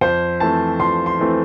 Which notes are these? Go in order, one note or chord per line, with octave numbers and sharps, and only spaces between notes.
F2 C5
E3 A3 C4 A5
F2 C6
C6
E3 A3 C4